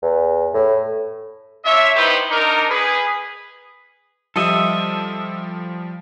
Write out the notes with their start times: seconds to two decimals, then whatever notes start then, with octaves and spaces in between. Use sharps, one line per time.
0.02 E2
0.54 A2
1.65 D4 F4 C#5 E5
1.96 B3 D#4 E4 G4 B4 C5
2.30 D4 D#4 A#4
2.69 G#4 B4
4.36 F3 G3 F4 A4 D#5 E5